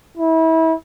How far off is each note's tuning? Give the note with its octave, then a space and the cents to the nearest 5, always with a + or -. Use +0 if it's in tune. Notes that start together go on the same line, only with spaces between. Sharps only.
E4 -30